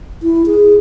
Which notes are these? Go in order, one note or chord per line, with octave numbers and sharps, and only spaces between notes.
E4
G#4